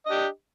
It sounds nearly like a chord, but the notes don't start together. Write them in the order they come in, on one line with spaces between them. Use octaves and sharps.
D#5 D4 G4